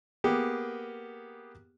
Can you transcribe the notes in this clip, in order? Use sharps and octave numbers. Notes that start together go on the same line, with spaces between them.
A#3 B3 G4 G#4